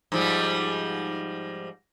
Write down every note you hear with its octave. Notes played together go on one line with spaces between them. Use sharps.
G#2 F3 G3